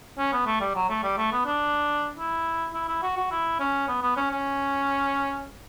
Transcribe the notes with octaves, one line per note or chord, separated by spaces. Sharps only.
C#4
B3
A3
G3
F#3
A3
G3
A3
B3
D4
E4
E4
E4
F#4
F#4
E4
C#4
B3
B3
C#4
C#4